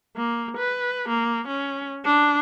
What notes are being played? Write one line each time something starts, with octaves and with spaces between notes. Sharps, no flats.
A#3
B4
A#3
C#4
D4